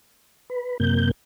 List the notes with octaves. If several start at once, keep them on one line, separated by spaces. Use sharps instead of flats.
B4
F#2 C3 A#3 G6